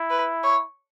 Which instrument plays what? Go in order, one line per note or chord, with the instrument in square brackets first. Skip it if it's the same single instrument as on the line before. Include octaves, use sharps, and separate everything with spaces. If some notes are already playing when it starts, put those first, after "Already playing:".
Already playing: [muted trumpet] E4
[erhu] B4
C#5